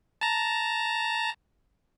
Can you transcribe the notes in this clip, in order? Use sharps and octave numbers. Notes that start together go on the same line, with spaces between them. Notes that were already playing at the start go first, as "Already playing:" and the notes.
A5 A#5